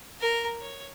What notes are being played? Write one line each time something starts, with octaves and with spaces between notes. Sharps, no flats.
A#4 A#5
C#5